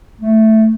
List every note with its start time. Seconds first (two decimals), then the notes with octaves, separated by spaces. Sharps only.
0.21 A3